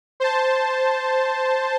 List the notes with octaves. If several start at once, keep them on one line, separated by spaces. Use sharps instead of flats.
C5 A5